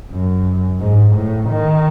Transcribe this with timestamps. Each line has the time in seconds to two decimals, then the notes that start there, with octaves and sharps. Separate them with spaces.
0.12 F#2
0.80 G#2
1.15 A2
1.50 D#3